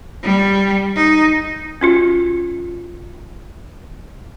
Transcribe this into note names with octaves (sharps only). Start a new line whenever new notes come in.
G3
D#4
C#4 F4 F#4